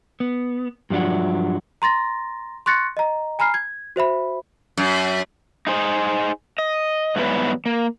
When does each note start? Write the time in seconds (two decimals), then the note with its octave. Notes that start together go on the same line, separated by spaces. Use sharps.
0.20 B3
0.90 G2 F3 F#3 D4 F#4
1.82 A#5 C6 A6 A#6
2.66 C6 C#6 F#6 A6 A#6 C#7
2.97 D#5 A#5
3.39 G#5 A#5 B5 F6 C7
3.54 G#6
3.96 F#4 C5 E5 B5
4.77 F#2
5.67 D#4 G#4 C5
6.58 D#5
7.16 G#2 E3 F#3 G3 B3 B4
7.66 A#3